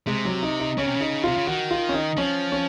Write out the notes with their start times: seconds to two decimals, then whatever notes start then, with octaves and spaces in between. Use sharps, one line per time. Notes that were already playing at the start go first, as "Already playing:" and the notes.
0.07 C3 G#3
0.25 F#3
0.43 D#4
0.60 D#4
0.78 C#3 C#4
0.87 C3
0.96 C#3 D#4
1.24 C3 F4
1.37 C#3
1.47 D#3 F#4
1.71 F4
1.89 C#4
1.94 D#4
2.17 F3 C#4
2.52 C#4